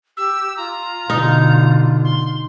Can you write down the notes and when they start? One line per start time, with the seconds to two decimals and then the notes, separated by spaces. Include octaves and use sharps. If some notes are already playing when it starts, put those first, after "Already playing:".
0.17 G4 E6
0.57 F4 A#5
1.10 B2 D3 D#4
2.05 C6